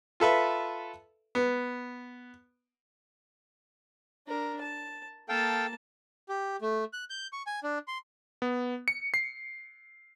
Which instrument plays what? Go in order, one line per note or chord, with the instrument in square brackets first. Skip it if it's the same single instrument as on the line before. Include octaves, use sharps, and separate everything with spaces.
[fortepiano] F4 A4 B4 E5
B3
[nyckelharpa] D4 A#4
A5
[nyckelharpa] A#3 A5 [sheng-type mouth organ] A4 F5 G5
[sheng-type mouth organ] G4
A3
F#6
G6
C#6
G#5
D4
C6
[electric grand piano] B3
C#7
C7